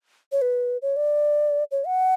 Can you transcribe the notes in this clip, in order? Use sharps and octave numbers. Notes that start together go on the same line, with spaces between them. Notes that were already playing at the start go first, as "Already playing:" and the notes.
C#5
B4
C#5
D5
C#5
F#5